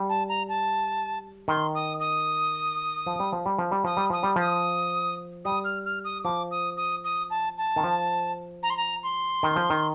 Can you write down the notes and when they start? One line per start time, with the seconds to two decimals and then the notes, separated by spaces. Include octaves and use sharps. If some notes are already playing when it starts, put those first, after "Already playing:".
Already playing: G3
0.09 A5
0.29 A#5
0.49 A5
1.48 D#3 C6
1.75 D#6
2.00 D#6
3.06 F3
3.20 G3
3.33 F3
3.46 G3
3.58 F3
3.71 G3
3.84 F3 D#6
3.97 G3
4.10 F3 D#6
4.23 G3
4.36 F3 D#6
5.45 G3 D#6
5.64 F6
5.85 F6
6.04 D#6
6.24 F3 D6
6.51 D#6
6.77 D#6
7.04 D#6
7.30 A5
7.58 A5
7.76 D#3
7.84 F3
8.63 A#5
8.70 C6
8.77 A#5
9.03 C6
9.43 D#3
9.56 F3
9.70 D#3